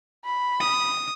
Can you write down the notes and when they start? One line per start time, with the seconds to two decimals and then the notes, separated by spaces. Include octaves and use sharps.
0.25 B5
0.60 D#6